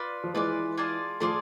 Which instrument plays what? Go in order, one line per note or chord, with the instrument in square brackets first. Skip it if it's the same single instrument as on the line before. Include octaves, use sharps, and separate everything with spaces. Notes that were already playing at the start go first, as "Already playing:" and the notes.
Already playing: [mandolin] F4 B4 D5
[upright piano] F3
[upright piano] E3 G#3 [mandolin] F4 B4 D5
[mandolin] F4 G#4 D5 A5
[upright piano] F3 A3 [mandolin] F4 G#4 D5 A5